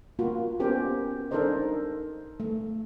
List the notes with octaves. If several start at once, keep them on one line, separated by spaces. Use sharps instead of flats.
A#3 F4 F#4
B3 C#4 G4 A#4 C5
D4 D#4 A4 A#4 C5 D#5
A3